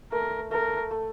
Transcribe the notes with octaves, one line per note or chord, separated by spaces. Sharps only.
A3 A#4
A3 A#4
A3